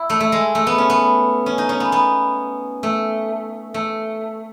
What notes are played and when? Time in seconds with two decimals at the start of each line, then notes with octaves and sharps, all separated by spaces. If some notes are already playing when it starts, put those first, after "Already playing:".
Already playing: E4
0.10 A3
0.20 A3
0.32 G#3
0.55 A3
0.67 B3
0.78 C#4
0.90 B3
1.46 C#4
1.58 D#4
1.69 C#4
1.80 B3
1.92 B3
2.83 A3
3.74 A3